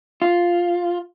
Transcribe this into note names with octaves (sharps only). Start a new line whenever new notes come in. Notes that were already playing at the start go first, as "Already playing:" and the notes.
F4